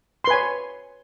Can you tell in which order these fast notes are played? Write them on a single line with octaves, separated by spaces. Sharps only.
C6 B4 G#5 C#5